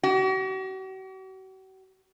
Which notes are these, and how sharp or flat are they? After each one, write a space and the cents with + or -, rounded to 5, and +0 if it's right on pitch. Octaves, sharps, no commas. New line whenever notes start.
F#4 +45